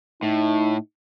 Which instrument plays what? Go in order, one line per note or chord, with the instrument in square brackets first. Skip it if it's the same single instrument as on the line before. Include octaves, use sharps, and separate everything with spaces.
[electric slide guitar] A2 [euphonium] D#4